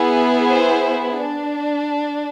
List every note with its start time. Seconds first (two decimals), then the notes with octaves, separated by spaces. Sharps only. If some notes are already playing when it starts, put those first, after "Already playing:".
Already playing: B3 E4 G#4
0.46 C5
1.17 D4